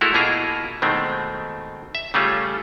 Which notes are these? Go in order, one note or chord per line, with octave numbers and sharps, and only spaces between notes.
G#3 A3 E4 F#4 A4 A#4
B2 A#3 E4 F4 G#4 A#5
B2 D#3 G#3 A3 C4
E5
C#3 G3 A3 C#4 F4